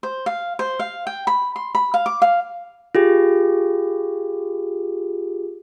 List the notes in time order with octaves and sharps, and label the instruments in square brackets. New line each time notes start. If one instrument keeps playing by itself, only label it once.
[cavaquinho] C5
F5
C5
F5
G5
B5
C6
B5
F5
D6
F5
[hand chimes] F4 G4 G#4